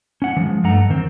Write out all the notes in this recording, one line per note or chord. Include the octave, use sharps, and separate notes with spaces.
C#4 F#5
E3 F3 G#3
G2 A3 D4 F#5 A#5
E2 D#3 C4